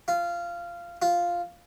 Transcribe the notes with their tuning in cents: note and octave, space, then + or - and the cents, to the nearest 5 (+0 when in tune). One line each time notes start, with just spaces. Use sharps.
F4 -15
F4 +0